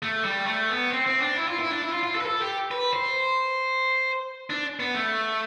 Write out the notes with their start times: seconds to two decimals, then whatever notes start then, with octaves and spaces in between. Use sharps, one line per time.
0.03 A3
0.25 G3
0.47 A3
0.70 B3
0.92 C4
1.07 C4
1.22 D4
1.36 E4
1.48 F4
1.59 E4
1.71 D4
1.82 E4
1.92 F4
2.03 F4
2.15 A4
2.21 B4
2.26 A4
2.41 G4
2.71 B4
2.93 C5
4.50 D4
4.79 B3
4.94 A3